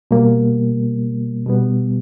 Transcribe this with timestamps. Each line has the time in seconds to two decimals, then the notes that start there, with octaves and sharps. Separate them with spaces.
0.11 B2 G3 A#3
1.46 B2 G3 B3